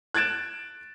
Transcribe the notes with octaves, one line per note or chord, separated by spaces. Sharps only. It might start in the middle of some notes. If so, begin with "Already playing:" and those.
F#6 G#6 A6 D7 E7